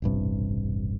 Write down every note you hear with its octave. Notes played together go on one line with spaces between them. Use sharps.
E1 A1 G2 C3